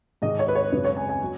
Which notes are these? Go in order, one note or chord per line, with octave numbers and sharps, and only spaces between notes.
G#2 D#3 G#3 D#5
C#5
B4
C#5
F#2 C#3 G#3 B4
C#5
G#5
G#5
F#3